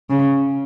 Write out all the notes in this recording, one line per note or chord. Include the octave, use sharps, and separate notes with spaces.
C#3